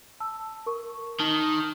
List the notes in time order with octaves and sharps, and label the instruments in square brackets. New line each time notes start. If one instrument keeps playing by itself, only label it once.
[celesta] A5 E6
A#4 C#6
[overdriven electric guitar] D#3 [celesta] A5